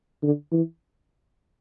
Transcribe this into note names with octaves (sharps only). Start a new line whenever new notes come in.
D3
E3